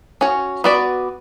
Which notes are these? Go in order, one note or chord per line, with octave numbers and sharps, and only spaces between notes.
C#4 F#4 C#5
B3 F#4 B4 D5